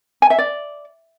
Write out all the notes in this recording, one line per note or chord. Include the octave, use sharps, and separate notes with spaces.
G#5
E5
D5